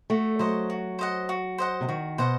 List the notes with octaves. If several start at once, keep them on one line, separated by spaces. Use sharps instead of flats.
A3 F#4
F#3 C5 D#5 F#5
F#4
C5 D#5 F#5
F#4
C5 D#5 F#5
C3
D#3 F#4
B2 C5 D#5 F#5